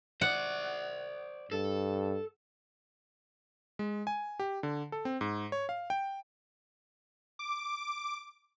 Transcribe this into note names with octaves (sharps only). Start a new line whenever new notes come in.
C5 D5 F#5
G2 A4
G#3
G#5
G4
D3
A4
C4
G#2
C#5
F5
G5
D6